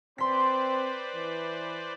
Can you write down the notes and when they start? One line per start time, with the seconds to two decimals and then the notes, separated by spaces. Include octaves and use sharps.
0.18 C4 B4 C5 D5 C6 B6
1.15 E3